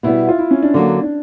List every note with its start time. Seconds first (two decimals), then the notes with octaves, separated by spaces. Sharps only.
0.03 B2 G3 B3 E4
0.29 F4
0.39 E4
0.51 C#4
0.63 D4
0.74 D3 F#3 A#3
1.04 D4